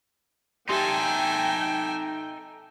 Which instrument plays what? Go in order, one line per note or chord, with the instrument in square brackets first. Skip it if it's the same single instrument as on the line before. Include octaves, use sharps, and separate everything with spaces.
[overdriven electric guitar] D#4 A4 [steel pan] G4 C6 [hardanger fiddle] E5 G#5 [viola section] G5